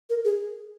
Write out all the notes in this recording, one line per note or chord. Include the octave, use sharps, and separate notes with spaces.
A#4
G#4